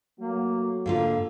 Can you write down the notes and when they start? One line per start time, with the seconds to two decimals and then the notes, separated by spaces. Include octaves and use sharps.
0.20 F#3 A3 A#3 F#4
0.86 G#2 D3 A#3 F4 A4 F5